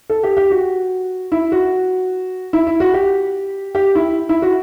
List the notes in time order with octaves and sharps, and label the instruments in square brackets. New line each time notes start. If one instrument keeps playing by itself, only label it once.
[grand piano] A4
G4
G4
F#4
E4
F#4
E4
E4
F#4
G4
G4
E4
E4
F#4